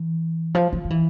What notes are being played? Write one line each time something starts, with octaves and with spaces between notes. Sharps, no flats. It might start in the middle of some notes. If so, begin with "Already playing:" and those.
Already playing: E3
F3
F3
F3
E3